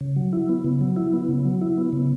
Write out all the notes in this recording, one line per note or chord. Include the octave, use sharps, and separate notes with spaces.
C#3
F#3
E4
B3
C#3
F#3
E4
B3
C#3
F#3
E4
B3
C#3